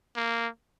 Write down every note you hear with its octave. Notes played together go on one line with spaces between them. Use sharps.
A#3